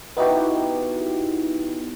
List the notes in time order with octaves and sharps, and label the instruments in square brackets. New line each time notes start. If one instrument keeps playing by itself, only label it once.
[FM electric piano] B3 D#4 E4 F#4 G4